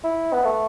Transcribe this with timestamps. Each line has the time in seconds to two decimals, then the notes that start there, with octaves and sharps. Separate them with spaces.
0.04 E4
0.33 B3
0.45 A3